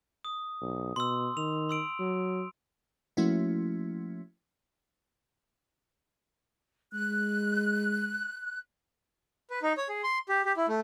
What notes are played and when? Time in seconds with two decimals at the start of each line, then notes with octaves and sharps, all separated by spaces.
0.25 D#6
0.62 B1
0.96 B2 C6 E6
1.37 D#3 F7
1.69 C6 E6 D7
1.99 F#3
3.17 F3 A3 A#3 C#4 E4 F#4
6.94 G#3 F#6
9.50 B4
9.62 D#4
9.77 C#5
9.89 G#4
10.03 C6
10.29 G4
10.45 G4
10.57 E4
10.68 A3